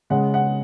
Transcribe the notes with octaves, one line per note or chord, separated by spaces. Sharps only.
C#3 G#3 C#4 F#5
F#5